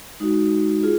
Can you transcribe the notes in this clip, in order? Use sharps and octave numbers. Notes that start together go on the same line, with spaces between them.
G#3 D#4 F#4
F4 G#4